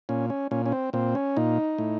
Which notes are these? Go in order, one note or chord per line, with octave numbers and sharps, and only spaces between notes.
A#2 C#4
C#4
A#2 C#4
C#4
C4
A#2 C4
C#4
A#2 D#4
A2